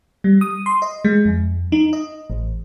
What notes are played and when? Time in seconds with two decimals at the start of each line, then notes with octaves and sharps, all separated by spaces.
0.24 G3
0.41 D#6
0.66 C6
0.82 D#5
1.05 G#3
1.25 F2
1.72 D#4
1.93 D#5
2.30 A1